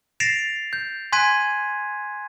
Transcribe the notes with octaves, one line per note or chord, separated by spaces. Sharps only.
A6 A#6 C7 D7 E7 F7
G6
G#5 C6 F#6 G#6 B6 D#7